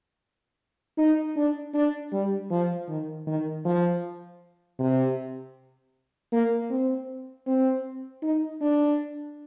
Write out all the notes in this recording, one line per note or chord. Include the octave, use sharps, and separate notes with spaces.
D#4
D4
D4
G3
F3
D#3
D#3
F3
C3
A#3
C4
C4
D#4
D4